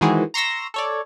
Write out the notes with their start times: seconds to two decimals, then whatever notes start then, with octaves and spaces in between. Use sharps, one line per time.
0.01 D#3 E3 G#3 F#4 G#4 C5
0.34 A#5 C6 C#6 E6 A#6
0.74 A4 C#5 D5